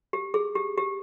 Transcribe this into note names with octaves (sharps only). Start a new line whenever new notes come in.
G4
G#4
G4
G4